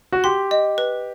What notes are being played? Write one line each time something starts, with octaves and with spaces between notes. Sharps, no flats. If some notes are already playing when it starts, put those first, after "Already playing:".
F#4
G4 C6
D#5
B4